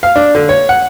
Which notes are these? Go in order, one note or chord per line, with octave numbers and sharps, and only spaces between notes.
F5
D4
D3
C#5
F#5